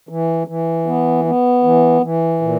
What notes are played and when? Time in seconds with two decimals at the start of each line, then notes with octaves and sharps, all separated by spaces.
0.09 E3
0.47 E3
0.86 B3
1.25 B3
1.63 E3
2.02 E3
2.41 A#2